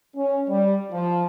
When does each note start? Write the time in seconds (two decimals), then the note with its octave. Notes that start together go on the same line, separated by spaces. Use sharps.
0.16 C#4
0.48 G3
0.92 F3